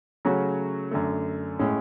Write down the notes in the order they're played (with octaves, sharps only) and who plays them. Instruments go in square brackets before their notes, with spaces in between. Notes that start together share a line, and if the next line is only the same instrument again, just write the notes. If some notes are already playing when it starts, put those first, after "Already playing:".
[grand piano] C#3 F#3 A3 C#4 F#4
F#2 D3 A3
A2 G#3 C#4